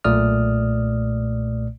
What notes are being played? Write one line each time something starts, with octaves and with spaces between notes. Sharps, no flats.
B1 A#2 A3 D5 D#6 F6